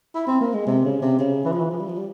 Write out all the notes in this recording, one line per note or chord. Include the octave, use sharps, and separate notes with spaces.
E4
C4
A#3
G#3
C3
C#3
C3
C#3
E3
F3
E3
F3
G3
F3
G3